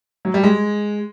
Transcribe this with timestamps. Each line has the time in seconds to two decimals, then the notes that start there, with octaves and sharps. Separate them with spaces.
0.25 F#3
0.34 G3
0.43 G#3